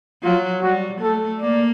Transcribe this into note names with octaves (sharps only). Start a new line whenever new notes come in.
F#3 F4
G3 F#4
A3 A4
A#3 D5